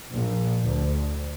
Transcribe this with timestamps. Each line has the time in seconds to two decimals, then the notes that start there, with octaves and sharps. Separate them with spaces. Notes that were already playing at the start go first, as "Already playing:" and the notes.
0.13 A#1
0.66 D2